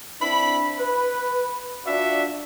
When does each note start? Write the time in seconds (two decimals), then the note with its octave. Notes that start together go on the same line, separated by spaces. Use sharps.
0.21 C4 D4 E4 B5
0.79 B4
1.86 D4 F4 F#4 D5 E5